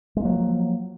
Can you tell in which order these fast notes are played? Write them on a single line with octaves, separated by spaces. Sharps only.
G#3 A#3 F#3 F3